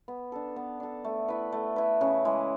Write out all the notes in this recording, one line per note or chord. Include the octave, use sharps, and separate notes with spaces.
B3
D4 A4
B3
D4 A4
A3
E4 B4
A3
E4 B4
C#3
E3 G#3